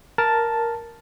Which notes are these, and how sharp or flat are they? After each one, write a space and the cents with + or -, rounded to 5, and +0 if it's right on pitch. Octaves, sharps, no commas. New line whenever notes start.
A#4 +0 A5 +0